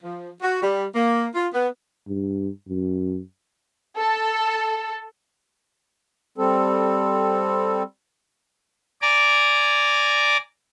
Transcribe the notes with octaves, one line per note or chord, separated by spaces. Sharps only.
F3
F#4
G3
A#3
F4
B3
G2
F#2
A4
G3 C4 A4
D5 G#5 A#5 D6